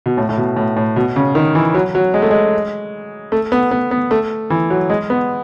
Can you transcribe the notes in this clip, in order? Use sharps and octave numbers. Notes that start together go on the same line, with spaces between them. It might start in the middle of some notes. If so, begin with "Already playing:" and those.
B2
A2
A2
B2
A2
A2
B2
C#3
D#3
E3
F#3
F#3
G#3
A3
G#3
A3
B3
B3
B3
A3
E3
F#3
G#3
B3